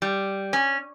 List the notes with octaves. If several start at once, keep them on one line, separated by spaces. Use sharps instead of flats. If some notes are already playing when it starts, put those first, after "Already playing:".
G3
C#4